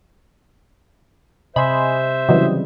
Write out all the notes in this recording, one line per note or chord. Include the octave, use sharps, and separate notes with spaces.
C3 C5 D#5 E5 G#5 B5 C6
C#3 E3 F#3 G3 C4 E4 D#5